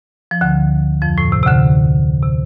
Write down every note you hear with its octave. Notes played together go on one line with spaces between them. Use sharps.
F3
D2 D3
F2 F3
A2
C3
C3
D2 D3
C3